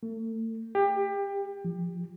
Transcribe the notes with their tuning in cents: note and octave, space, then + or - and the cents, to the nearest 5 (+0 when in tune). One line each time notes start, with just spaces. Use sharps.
A3 +35
G4 +25
F3 +0